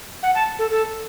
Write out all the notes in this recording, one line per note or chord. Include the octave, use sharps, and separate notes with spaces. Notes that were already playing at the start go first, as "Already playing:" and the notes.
F#5
A5
A4
A4